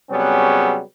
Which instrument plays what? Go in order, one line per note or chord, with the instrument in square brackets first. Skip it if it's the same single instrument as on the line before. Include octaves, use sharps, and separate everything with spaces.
[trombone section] C3 F#3 G3 B3 C#4 G#4